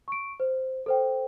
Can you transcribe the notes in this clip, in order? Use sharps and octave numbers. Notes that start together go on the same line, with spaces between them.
C#6 D7
C5
A4 C5 G5